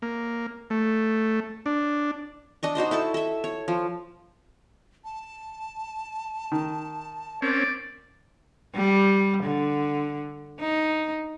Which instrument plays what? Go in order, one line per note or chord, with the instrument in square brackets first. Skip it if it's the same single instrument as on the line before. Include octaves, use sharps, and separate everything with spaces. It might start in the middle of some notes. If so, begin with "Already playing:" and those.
[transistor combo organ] A#3
A3
D4
[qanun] D4 D#5 C#6
D#4 F#4 C5 D#5
E4 A4 A5 C#6
A4 E5
C#5
F3
[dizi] A5
[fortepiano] D#3
[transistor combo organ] C4 C#4 [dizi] A#4 [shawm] D5
[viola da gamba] G3
D3
D#4